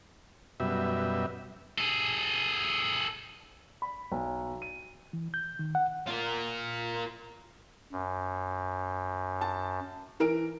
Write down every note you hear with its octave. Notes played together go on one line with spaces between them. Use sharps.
F#2 B2 G3 E5
G#4 A4
B5
B1
D#7
E3
G6
D#3
F#5
F4 A#4
F#2
A5
E3 A#4 D7